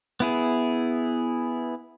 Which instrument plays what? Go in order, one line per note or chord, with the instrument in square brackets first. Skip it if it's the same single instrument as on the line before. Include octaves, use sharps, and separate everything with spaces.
[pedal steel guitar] B3 E4 G#4